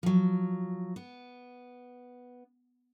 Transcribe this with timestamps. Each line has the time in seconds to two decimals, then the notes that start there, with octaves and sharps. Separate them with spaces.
0.03 F3 F#3
0.96 B3